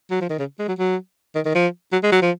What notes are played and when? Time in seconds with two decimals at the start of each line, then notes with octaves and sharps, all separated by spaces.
0.11 F#3
0.21 F3
0.30 D#3
0.39 C#3
0.59 G#3
0.68 F#3
0.78 F#3
1.35 D#3
1.46 D#3
1.55 F3
1.92 F#3
2.03 G#3
2.12 F#3
2.22 F3